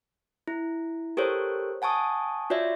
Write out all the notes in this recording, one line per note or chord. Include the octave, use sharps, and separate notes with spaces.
E4
G4 A4 A#4 C5 C#5
F#5 G#5 A5 C#6 D#6
F4 F#4 C#5 D5 E5